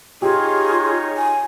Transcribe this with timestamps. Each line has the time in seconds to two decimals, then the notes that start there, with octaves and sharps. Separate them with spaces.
0.22 D#4 F4 G4 G#4 C#5
1.16 G#5